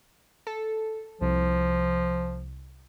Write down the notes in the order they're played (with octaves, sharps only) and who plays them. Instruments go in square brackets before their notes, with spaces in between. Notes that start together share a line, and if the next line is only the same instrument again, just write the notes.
[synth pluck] A4
[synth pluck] C2 [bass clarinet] F3